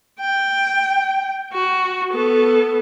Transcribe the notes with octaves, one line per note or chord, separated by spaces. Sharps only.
G5
F#4
B3 A4